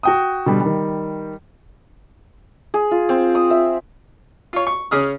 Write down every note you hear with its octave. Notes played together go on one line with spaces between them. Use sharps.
F#4 G5 D#6
B2 D3 G3
D#3 G3
G#4
F4
C4
D#6
E5
F4 C#5
C#6
C#3 C#4 G#4 D#6 F6